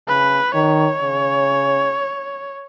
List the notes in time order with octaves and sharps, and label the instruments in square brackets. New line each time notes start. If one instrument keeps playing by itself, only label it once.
[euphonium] C#3 [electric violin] B4
[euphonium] D#3 [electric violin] C#5
[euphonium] C#3